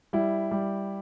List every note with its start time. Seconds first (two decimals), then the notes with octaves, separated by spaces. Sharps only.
0.13 G3 E4
0.51 G3